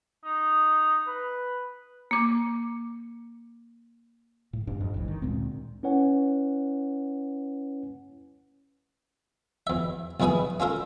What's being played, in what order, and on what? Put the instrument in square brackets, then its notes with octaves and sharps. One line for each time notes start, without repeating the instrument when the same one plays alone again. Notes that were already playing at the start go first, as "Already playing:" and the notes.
[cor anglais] D#4
B4
[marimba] A#3 D6
[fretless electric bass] A2
A1 G2 D4
F2
F#1 C#2 G#2 E3
D#3
D2 A#2 G#3 C4
[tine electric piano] C#4 E4 B4 C#5 F#5 G#5
[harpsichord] E2 E5
B1 E2 E4 G#4 B4 D#6
C#4 F4 A4 A#4